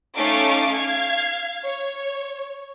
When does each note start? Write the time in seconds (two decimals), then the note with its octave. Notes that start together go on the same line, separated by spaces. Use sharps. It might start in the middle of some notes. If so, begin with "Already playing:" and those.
0.16 A3 C#4 D#4 F5 C#6 D6
0.74 F5 G#6
1.64 C#5